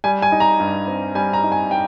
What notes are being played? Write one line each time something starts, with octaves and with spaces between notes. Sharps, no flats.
G3 G#5
G#5
D#4
A#5
G2
C4
G3 G#5
A#5
D#4
G#5
G5